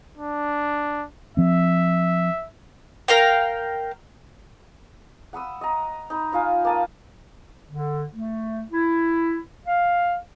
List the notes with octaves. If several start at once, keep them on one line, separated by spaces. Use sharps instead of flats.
D4
F3 C4 E5
A#4 F5 G5
F#5 B5 D#6 E6
D#5 A#5
D#4 B5
D#4 F4 F5 G#5
A#3 A5 D#6
D3
A3
E4
F5